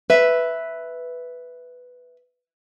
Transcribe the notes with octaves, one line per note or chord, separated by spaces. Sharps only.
B4 E5